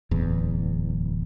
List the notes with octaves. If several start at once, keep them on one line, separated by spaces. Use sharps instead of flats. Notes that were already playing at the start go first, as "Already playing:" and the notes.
D1 E2